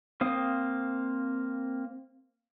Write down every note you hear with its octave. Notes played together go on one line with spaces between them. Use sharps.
A#3 C4 C5 F5 D#6